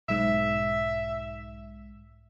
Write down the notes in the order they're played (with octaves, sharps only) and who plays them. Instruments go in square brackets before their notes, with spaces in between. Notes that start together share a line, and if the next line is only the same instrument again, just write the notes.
[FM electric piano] B1 G#2 [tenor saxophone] E5